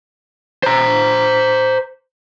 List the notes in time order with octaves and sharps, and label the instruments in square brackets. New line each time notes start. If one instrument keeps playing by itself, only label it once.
[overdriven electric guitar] C5 A#5